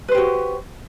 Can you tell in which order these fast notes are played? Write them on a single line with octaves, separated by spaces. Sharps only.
B4 C5 G4 F#4